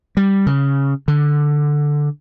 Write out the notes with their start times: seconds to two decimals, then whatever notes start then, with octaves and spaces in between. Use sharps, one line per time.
0.17 G3
0.47 C#3
1.08 D3